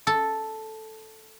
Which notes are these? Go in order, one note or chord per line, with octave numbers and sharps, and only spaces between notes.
A4